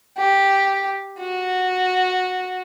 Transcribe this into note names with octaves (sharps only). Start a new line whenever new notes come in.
G4
F#4